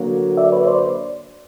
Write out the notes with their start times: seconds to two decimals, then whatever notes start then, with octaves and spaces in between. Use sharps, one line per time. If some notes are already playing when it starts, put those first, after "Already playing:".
Already playing: D3 F#3 A#3
0.37 D5 E5
0.52 B4 C#5
0.67 C5 D5